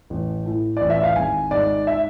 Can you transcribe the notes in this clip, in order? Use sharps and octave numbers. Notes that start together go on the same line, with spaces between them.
A1
A2
A1 D5
E5
F5
G#1 G#5
G#2 D5
E5